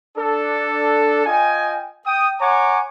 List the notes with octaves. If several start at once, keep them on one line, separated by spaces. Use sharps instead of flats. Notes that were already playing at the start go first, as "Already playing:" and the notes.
D4 A4
F4 D#5 G5 G#5
G5 D#6
C#5 F#5 G#5 A#5 C#6 D6